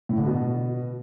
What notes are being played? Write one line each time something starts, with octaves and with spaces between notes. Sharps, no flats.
A2
D3
B2